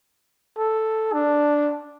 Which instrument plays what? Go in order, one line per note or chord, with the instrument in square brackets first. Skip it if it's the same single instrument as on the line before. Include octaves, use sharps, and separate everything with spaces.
[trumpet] A4
D4